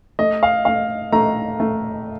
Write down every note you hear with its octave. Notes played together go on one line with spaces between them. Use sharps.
A3 D#5
F5
A3 F5
A3 A#5
A3